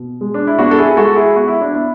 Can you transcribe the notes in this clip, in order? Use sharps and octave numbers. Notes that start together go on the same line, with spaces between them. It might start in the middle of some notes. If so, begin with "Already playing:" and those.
Already playing: B2
G#3
D4
E4
B3 D4 F#4
A4
E4 G#4
G#4
G#3 F#4 A4
E4 G#4
B3 F#4
E4
D4
B3 E4